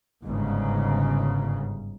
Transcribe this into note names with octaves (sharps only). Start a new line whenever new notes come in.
G1 G#2 C#3